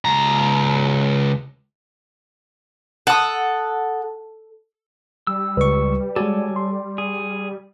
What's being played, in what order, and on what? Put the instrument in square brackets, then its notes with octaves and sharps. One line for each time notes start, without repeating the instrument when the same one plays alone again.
[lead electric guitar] C#2 A#5
[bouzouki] A4 [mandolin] F#5 D#6
[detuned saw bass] G3 [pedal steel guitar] E6
[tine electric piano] C#2 C#6 [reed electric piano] B4
[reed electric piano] G#3 F#4 [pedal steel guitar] A4 C#5 G#5 [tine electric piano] D5
[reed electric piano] C6
[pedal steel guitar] G#4